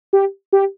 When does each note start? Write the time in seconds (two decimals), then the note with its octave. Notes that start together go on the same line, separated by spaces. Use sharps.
0.13 G4
0.53 G4